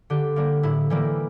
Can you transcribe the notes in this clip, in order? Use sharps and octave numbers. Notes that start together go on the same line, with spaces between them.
D3 G4
G3 A#3
A2 E4
E3 G3 A#3